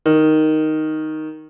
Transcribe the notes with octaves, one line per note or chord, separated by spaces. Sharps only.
D#3